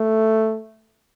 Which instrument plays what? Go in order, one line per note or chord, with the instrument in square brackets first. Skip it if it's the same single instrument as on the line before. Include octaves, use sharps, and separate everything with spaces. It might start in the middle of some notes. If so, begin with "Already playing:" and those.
Already playing: [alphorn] A3